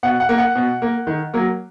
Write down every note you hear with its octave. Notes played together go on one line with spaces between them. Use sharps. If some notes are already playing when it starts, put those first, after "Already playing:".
B2 F#5
F#5
A#3
F#5
B2
A#3
D#3
F#3 A#3